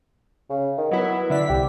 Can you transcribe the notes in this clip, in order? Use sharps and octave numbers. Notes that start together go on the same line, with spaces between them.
C#3
D#3
F#3 B3 E4
D3 D4 E4 B6
C2 G4